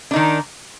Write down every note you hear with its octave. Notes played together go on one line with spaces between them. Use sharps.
D#3 D4 D#4